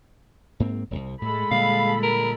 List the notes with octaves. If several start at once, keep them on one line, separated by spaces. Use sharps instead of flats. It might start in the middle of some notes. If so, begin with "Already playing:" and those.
G#2 A#3 C4
E1 C2
A2 G#3 A4 B5
A#2 D3 G3 F5
A#4